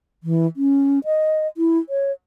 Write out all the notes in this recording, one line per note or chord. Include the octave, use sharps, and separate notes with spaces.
E3
C#4
D#5
E4
C#5